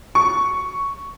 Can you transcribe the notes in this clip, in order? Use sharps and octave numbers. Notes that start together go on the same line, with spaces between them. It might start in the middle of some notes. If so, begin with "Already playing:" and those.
C#6